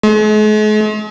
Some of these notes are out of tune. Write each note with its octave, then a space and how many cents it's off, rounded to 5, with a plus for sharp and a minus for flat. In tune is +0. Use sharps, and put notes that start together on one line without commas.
G#3 +45